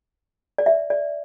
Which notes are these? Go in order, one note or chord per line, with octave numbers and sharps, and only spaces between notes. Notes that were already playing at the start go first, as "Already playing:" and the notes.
D5
E5
D5